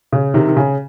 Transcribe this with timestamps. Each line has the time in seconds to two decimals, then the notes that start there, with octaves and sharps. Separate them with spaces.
0.13 C#3
0.34 C3 D#3
0.48 D#3
0.57 C#3